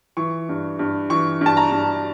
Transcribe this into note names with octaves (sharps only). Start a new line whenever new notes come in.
E3 C#6
G2
G2
E3 C#6
G2 A5
A#5
G2